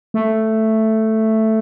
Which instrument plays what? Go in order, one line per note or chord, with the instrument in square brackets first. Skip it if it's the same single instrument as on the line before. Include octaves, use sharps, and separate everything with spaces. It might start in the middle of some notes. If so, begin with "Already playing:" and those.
[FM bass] A3